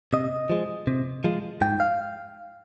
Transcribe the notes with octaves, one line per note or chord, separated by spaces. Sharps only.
C3 D#5
F3 G#3
C3
F3 G#3
G#2 G5
F5